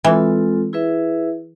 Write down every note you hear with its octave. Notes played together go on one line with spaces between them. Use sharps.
E3 G#3 C4 F4 A4
E4 G#4 B4 E5